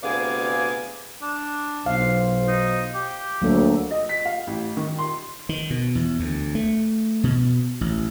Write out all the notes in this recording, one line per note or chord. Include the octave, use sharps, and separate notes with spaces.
D2 C3 B3 G#4 D5 F5
D4
B1 C5 F5
D#4
G4
D2 F#3 A#3 A4
D#5
B6
F5
A1
D#3
C6
D#3
B2
E2
D2
A3
B2
A1